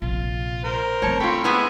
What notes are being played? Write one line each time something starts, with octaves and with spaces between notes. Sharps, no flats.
A#1 C3 F4
A#4 C5
A3 C4 C#5 A5
F4 A4 G5 B5 C#6
G#3 B3 E4 E5 F#5 G#5